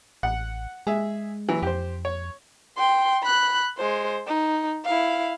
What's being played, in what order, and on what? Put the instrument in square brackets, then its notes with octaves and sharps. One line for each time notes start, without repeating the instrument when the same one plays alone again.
[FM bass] A1 [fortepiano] F#5
[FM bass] G#3 [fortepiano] G#4 E5
[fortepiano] E3 F#3
[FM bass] F2 [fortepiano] G4 C5
[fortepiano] C#5
[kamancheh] G5 C6
B5 F#6
G#3 C5
D#4
E4 F5